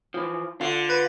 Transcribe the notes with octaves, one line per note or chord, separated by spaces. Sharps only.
E3 F3
D3 F4
B4